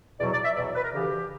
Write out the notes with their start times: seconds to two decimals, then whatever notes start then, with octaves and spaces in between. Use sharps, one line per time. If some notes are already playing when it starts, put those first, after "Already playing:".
0.20 E2 B2 F#3 D5
0.33 D5
0.44 E5
0.56 E2 B2 F#3 D5
0.75 B4
0.84 A#4
0.93 D2 C#3 E3 G4